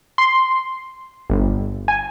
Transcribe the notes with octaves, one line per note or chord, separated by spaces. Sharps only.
C6
G1
G#5